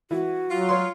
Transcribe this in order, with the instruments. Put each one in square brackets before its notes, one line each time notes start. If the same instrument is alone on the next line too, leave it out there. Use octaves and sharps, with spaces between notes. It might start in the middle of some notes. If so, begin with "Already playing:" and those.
[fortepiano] E3 [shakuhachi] F#4
[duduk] F#3 [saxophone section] F4
[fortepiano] C#5 C6